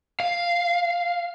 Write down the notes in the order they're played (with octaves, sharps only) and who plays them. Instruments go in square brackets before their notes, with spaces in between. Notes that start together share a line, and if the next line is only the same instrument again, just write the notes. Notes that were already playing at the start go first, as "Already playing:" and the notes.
[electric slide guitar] F5